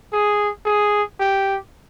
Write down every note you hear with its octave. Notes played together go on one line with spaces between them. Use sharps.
G#4
G#4
G4